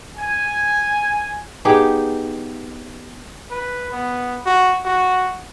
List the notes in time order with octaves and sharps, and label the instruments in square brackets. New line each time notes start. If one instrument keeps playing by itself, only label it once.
[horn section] G#5
[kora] B3 D#4 G4 G#4
[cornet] B4
B3
F#4
F#4